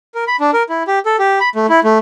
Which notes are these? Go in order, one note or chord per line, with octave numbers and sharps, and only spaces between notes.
A#4
B5
D4
A#4
E4
G4
A4
G4
B5
A3
E4
A3